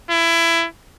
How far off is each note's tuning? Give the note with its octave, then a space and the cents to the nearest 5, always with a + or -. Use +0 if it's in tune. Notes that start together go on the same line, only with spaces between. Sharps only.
E4 +20